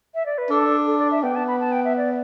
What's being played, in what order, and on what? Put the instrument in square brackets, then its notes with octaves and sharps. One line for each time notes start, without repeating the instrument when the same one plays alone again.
[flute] E5
D5
B4
[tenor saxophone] D4 [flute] A4
[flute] A4
D5
E5
[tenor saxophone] B3 [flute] G5
[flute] A5
B5
A5
G5
E5
D5